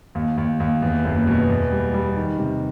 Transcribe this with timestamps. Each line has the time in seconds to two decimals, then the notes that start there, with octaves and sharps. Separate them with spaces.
0.15 D#2
0.38 D#2
0.60 D#2
0.82 E2
1.05 F#1
1.27 B2
1.49 E2
1.72 G3
1.94 G3
2.17 D#3
2.39 C3